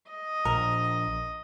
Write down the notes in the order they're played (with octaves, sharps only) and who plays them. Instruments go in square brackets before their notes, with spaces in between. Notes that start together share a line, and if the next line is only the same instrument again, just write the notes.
[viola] D#5
[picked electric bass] A#1 [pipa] A#4